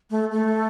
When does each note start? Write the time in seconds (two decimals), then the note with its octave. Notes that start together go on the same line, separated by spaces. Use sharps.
0.10 A3
0.31 A3